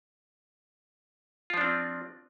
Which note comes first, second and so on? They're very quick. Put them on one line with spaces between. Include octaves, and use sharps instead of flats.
F4 F3 D4 C4